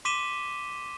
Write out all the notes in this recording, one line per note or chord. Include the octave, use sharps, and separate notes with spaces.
C6 D6 B6 D#7 E7 G7